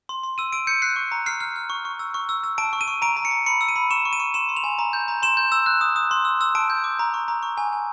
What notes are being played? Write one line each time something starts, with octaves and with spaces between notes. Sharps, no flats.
C6
C6
E6 D#7
E6 D7
G6 C#7
F#6 C7
C#6
A#5
F6 C7
F6
F6
C#6
C#6
E6
C#6
E6
E6
A5 D7
C#6
D#7
C#6
A#5 D7
A#5
C#7
A#5
B5 C#7
E6
D#7
B5
C#6 E7
C#6
D#7
C#6
C6 E7
C6
F7
G#5
A#5
G6
A#5
C6 E7
G6
E6
F#6
D#6
D#6
C6
E6
E6
A5 D7
G6
D6
A#5
C#6
A#5
C#6
G#5
G#5